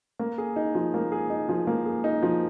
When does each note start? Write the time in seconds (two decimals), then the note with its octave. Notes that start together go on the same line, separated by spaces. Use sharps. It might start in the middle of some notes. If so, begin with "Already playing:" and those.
0.19 A#3
0.38 G#4
0.56 D#4
0.75 F3
0.94 A#3
1.12 G#4
1.30 D#4
1.49 F3
1.67 A#3
1.86 G#4
2.04 D#4
2.23 F3